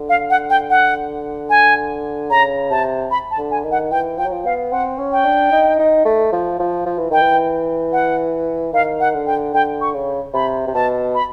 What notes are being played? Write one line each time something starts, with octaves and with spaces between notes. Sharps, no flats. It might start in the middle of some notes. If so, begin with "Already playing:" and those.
Already playing: D3
F5
F#5
G5
F#5
G#5
C#3 A#5
C3 A5
B5
A5
D3
G#5
D#3
F#5
E3 G5
F3 G5
F#3
F3
B3 F5
C4 F#5
C#4
G5
D4
D#4
D#4
A3
F3
F3
F3
E3
D#3 G5
E3
F#5
D#3 F5
F#5
D3
G5
D3 G5
C#6
C#3
C3 B5
C3
B2 A5
B5